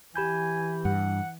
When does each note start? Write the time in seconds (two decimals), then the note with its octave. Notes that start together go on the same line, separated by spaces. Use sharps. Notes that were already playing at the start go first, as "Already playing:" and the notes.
0.16 E3 G4 G#5 B5 G6
0.85 G2 F#5